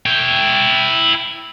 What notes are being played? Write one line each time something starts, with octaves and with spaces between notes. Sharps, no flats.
E4 G5